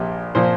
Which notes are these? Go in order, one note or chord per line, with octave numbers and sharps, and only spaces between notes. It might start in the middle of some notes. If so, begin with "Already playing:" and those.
Already playing: A#1 A#2 F3 G4
A#2 F3 C5